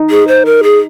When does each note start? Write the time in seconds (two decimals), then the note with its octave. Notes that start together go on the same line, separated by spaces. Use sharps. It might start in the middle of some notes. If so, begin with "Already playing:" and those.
Already playing: D#4
0.10 G#4
0.28 C5
0.46 A#4
0.63 G#4